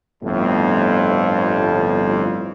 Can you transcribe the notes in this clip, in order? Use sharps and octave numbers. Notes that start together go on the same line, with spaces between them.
G1 F2 A2